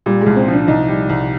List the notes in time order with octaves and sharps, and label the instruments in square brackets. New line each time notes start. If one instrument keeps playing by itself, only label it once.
[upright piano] A#2 [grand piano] G3
[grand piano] G#3
[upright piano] C2
[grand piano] C4
[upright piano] F3 [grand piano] D4
[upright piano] C2 [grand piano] D#4
[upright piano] G3
C2